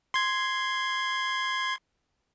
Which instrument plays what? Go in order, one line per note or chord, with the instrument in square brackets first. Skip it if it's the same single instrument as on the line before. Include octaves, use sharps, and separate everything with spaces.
[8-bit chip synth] C6 G#6